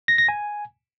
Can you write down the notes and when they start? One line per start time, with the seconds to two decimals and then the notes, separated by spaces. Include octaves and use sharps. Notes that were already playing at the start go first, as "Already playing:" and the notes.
0.08 A#6
0.18 A#6
0.29 G#5